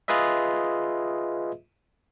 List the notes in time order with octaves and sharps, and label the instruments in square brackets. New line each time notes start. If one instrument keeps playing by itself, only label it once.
[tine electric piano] F4 G#4 B4 D#5 E5